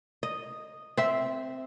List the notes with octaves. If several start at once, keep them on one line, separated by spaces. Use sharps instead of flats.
D#5
C4 E5